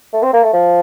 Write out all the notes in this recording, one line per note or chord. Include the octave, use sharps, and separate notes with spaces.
A3
C4
A#3
A3
F3